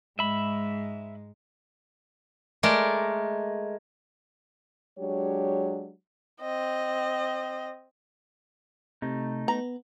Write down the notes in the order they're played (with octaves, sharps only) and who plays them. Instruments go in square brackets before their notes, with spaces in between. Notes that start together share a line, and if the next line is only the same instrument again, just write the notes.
[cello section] G#2 G#3 [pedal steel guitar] E5 B5
[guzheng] G#3 A3 A#4 D5
[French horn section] F#3 G#3 D4 G4 C#5
[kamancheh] C4 D#5
[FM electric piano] C3 [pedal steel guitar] A3 D#4
[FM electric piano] B3 [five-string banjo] A#5